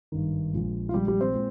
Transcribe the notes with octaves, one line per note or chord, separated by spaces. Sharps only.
G#1 G2 D#3
A#1 A#2 G#3
F4
A#1 A#2 G3 G#3 G4
G3 G4
C4 C5
A#2 G#3